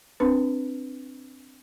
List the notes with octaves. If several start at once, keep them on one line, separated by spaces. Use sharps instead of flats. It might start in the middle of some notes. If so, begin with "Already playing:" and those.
C4 D4 B4